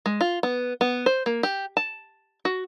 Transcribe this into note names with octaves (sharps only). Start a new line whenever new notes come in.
G#3
F4
B3
B3
C5
A#3
G4
A5
F#4